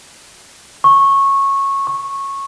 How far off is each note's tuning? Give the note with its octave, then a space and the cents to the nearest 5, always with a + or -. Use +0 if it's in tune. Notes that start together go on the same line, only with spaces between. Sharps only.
C#6 -15
C#6 -15